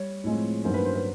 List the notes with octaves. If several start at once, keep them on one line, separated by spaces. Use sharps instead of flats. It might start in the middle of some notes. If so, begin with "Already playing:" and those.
Already playing: G3 C#5
A2 F3 G#3 C4
G2 D#3 F#3 A#3 C#4 C5
B4
C5
B4